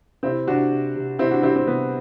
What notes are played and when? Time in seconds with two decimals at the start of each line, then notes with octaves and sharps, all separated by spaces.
0.23 C3 C4 E4
0.47 C3 D4 F#4
0.71 C3
0.96 C3
1.19 C3 C4 E4
1.31 D4 F#4
1.43 G3 C4 E4
1.56 C4
1.67 C3 B3